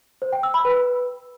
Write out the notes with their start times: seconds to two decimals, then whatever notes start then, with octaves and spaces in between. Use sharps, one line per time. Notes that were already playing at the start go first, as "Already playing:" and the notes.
0.22 C5
0.33 G5
0.43 E6
0.54 B5
0.65 B4